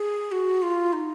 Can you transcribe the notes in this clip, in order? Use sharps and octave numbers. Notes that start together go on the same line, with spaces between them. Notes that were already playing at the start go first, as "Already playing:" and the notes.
Already playing: G#4
F#4
F4
D#4